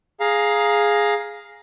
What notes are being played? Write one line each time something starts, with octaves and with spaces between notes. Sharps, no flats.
G#4 F5 A#5